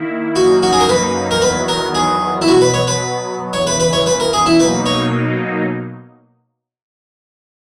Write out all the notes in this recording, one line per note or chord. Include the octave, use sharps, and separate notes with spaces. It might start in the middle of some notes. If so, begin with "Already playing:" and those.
Already playing: D#3 A#3 E4
F#2 C#3 F#3 A#3 D#4 F#4
F#4
G#4
A#4
B4
A#4
E2 D#3 F#3 B3 B4
A#4
G#4
E4
B2 F#3 B3 F#4
B4
C#5
B4
E2 C#3 E3 C#5
B4
B4
C#5
B4
A#4
G#4
E4
B2 F#3 A#3 D#4 B4
C#5